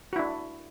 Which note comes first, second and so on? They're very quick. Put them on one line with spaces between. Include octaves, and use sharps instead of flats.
F#4 E4 D4